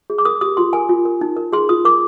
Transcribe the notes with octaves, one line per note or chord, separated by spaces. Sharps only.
G#4
D6
A#4 D#6
G4 D#6
F4 C6
A#4 G#5
F4
A#4
D#4
A#4
G#4 C6
F4 D#6
A#4 D6